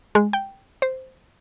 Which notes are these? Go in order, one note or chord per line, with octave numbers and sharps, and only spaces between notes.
G#3
G5
C5